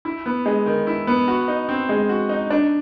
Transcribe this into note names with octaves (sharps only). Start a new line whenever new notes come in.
E4
B3
G#3
D#3
E4
B3
F#4
D#4
C4
G#3
F#4
D#4
D4